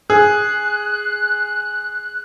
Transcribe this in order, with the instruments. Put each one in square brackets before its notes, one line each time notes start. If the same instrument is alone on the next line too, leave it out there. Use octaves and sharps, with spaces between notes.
[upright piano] G#4 [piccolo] F#6